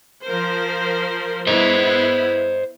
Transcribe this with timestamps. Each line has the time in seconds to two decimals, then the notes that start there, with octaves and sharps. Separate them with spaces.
0.25 F3 A#4 C5
1.47 B3 E4 C5 D#5